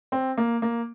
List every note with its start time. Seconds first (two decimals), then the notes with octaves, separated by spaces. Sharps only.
0.12 C4
0.38 A#3
0.62 A#3